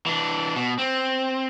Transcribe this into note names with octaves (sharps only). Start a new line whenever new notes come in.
E3 D4
B2
C4